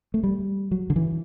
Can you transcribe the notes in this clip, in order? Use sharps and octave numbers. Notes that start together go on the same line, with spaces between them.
A3
G3
F#3
D3
E3